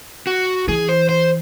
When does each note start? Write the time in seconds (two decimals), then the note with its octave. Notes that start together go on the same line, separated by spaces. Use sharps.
0.27 F#4
0.67 E3 G#4
0.89 C5
1.09 C5